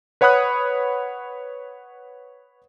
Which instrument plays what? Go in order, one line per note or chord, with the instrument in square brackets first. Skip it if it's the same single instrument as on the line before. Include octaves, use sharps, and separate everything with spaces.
[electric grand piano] B4 C#5 F#5 B5 D#6 F#6